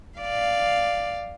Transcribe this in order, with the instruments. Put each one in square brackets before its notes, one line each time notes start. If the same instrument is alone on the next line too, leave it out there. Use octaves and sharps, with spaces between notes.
[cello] D5 F5